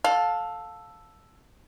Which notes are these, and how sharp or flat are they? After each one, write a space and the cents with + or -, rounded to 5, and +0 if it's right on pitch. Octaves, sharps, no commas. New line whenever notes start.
A4 +0 F5 +20